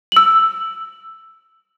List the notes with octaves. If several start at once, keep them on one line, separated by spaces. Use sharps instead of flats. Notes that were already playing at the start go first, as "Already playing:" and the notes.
E6 F#7